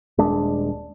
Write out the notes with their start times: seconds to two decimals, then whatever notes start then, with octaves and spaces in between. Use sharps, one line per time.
0.18 D#1 G#3 D4